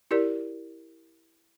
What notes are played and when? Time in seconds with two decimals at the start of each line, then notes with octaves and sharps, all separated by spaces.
0.11 E4 G4 A#4 D5